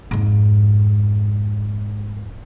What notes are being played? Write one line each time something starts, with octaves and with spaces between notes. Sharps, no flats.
F2 G#2